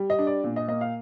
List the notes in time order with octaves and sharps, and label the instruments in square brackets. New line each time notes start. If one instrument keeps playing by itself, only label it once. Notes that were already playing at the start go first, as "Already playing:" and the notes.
Already playing: [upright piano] G3
D#5
D4
D5
A#2
D#5
A#3 D#5
F5